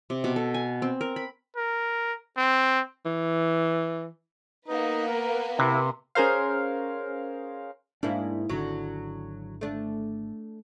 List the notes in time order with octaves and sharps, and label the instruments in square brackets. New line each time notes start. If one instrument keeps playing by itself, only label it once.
[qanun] C3
B2
A4
G#5
C4
A#4
B5
[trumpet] A#4
C4
[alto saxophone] E3
[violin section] A#3 B3 B4 [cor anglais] D#4
[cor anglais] A#4
[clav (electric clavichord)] C3 [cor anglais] E4
[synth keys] C#4 G#4 A#4 C5 F5
[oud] G#2 A#3 E4 [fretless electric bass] D4
[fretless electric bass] G#1 D3 [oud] F#3
[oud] A3 D4